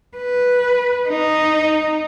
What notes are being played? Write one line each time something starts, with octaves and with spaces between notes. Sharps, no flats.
B4
D#4